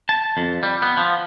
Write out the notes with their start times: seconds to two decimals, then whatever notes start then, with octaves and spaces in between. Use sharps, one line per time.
0.09 A5
0.37 F2
0.63 G3
0.82 B3
0.97 F3